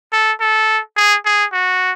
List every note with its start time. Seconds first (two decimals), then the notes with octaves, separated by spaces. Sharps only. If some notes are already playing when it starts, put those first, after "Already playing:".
0.13 A4
0.41 A4
0.97 G#4
1.26 G#4
1.53 F#4